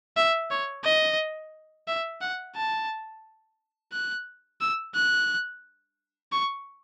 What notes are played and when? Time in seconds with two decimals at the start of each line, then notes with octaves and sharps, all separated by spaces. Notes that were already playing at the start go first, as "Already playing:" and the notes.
0.17 E5
0.51 C#5
0.84 D#5
1.88 E5
2.21 F#5
2.56 A5
3.92 F#6
4.61 E6
4.95 F#6
6.32 C#6